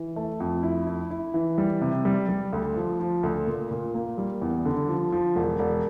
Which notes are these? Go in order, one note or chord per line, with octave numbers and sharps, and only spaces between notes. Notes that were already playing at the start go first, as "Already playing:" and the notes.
Already playing: E3
A3
F2
E4
E4
E4
E3
G3
C3
G3
G3
D2
F3
F3
D2
A#2
A#2
A#3
G3
E2
D3
F3
F3
E1
E1